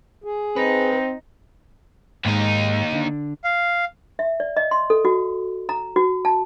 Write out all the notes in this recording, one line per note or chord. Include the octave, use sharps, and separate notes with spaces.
G#4
C4 D#4 B4
D#2 G#2 G#3 D#4
D3 D4
F5
E5
D5
D#5
C6
A4
F#4
A#5
F#4
A5